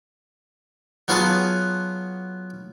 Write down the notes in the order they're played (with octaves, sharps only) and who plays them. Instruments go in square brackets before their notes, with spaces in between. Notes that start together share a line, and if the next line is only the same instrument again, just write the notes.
[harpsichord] F#3 B3 F4 F#4 G#4 A5